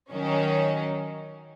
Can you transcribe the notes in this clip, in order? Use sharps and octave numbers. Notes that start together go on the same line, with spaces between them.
D#3 F#3 C#4